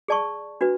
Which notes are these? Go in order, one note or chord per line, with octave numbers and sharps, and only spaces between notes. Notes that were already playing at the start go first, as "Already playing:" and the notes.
G#4 D5 A5 C#6
D4 F#4 B4